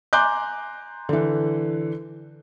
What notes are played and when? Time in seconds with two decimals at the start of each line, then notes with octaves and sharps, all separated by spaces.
0.13 G#5 A#5 C6 D6 F#6 G6
1.09 D3 E3